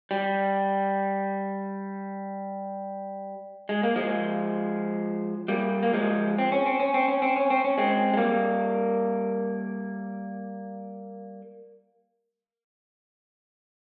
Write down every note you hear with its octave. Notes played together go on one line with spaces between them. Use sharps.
G3
G#3
A#3
F3 G#3
G3 A#3
A#3
F3 G#3
C4
C#4
C4
C#4
C4
C#4
C4
C#4
C4
C#4
G#3 C4
G#3
G3 A#3